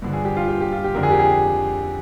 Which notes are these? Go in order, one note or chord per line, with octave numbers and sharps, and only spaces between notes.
G2 D3 F3
G#4
G4
F4
G4
G4
F4
G4
F2 D3 F3 A#4
G#4
G4
G#4